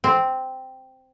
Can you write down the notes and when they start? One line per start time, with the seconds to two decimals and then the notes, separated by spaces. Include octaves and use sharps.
0.04 C4